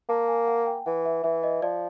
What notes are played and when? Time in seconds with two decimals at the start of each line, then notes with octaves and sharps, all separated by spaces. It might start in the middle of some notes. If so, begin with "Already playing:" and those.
0.09 A#3 A5
0.28 G#5
0.47 F#5
0.66 G5
0.86 E3 F#5
1.05 E5
1.24 E3 E5
1.43 D#5
1.62 F3 D5